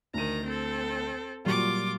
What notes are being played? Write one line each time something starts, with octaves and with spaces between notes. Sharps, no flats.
D2 D#3 A#5 D#7
C4 A4
A#2 F#3 G3 F4 D6